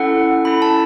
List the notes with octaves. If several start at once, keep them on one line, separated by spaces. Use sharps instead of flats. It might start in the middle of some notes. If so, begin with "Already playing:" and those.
Already playing: C#4 E4 A4 F#5
C#4 E4 A4 B5
A5